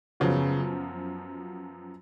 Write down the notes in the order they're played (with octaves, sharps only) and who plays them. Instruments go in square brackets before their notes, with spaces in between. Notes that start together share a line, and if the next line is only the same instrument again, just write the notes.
[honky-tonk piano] F#2 F3 B3 F#4 [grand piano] C#3